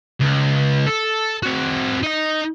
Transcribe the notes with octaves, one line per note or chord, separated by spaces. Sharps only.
C#2
A4
C4 F#4
D#4 D#5